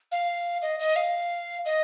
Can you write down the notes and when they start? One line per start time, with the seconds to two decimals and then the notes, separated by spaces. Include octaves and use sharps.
0.12 F5
0.62 D#5
0.80 D#5
0.96 F5
1.66 D#5